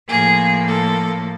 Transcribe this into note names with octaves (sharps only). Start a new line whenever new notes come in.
A2 F3 A#3 G#4
A4